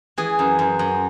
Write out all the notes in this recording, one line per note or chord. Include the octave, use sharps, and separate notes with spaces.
E3 G#4
F#2
F#2
F#2